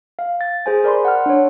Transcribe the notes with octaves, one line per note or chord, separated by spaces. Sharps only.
F5
A6
G#4 C5 G#5
A#4 D5 B5 C6
F#5 F6
D4 C#5